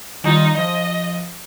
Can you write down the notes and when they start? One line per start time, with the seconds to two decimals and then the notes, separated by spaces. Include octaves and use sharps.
0.24 D#3 G3 D#4 F4
0.57 F3 D#5